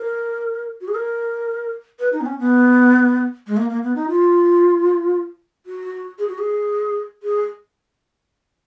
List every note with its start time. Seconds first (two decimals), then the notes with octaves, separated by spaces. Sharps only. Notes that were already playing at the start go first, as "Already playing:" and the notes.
Already playing: A#4
0.81 F#4
0.88 G#4
0.95 A#4
1.99 B4
2.13 D#4
2.21 B3
2.26 C#4
2.39 B3
3.47 G#3
3.57 A#3
3.70 A#3
3.83 B3
3.96 D#4
4.09 F4
5.66 F#4
6.18 G#4
6.28 F#4
6.38 G#4
7.23 G#4